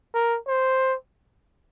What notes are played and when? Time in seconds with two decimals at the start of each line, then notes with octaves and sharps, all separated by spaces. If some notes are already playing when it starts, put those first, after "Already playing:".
0.14 A#4
0.47 C5